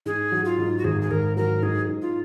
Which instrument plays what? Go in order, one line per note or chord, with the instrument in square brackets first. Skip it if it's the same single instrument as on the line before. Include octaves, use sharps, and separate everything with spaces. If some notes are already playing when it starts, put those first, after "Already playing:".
[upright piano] G#2 [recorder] G#4
[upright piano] F#3
[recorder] F4
[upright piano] G#2
[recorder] F#4
[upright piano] G#1 [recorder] G#4
[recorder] G#4
[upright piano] G#1 [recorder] A#4
[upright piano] F#3 [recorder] A#4
[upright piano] G#2 [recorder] G#4
[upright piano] G#2
[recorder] F4